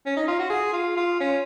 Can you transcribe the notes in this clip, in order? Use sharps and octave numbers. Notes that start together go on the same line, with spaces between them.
C#4
D#4
F4
F#4
G#4
F4
F4
C#4